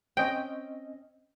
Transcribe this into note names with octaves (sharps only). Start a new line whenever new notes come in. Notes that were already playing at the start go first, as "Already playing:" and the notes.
C4 C#4 D#5 G5